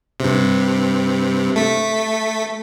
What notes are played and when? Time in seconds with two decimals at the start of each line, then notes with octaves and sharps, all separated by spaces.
0.20 G2 C3
1.56 A3 B6